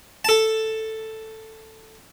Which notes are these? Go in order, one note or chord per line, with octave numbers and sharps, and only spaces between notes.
A4 A5